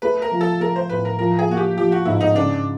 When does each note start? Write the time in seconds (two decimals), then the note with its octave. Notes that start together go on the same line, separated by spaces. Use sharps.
0.02 A3 B4
0.22 A#4
0.31 F3
0.41 A4
0.60 A3 A#4
0.76 C5
0.89 A2 B4
1.05 A#4
1.18 F3 A#4
1.39 G#4
1.48 A#3 F#4
1.57 G4
1.77 F3 G4
1.92 F#4
2.05 G#2 E4
2.21 D#4
2.35 C#3 D4